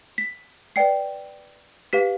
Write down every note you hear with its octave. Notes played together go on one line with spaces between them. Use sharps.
B6
B4 D5 G5 C7
G4 B4 F5 B6